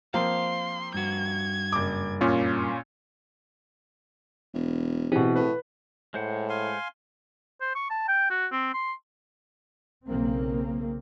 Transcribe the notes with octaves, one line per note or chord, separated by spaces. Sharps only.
F3 A#3 C4 F5 C6
G2 F#4 G#6
F#1 D6
A#2 C#4 F4
E1
B2 E3 C4 G4 G#4
A2 B4
A2 G#3 C5 F#5
F5 G#5 C6
C5
C#6
A5
G5
F#4
C4
C6
B1 C#3 A#3 C4